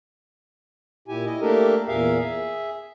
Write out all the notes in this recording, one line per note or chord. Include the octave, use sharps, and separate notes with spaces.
A#2 E4 G4 G#5
E4 D#5
A3 A#3 D4 G4 A4 A#4
E2 A#2 G#4 A#4 E5 F5
G#4 E5